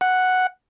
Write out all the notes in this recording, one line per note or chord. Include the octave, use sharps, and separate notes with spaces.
F#5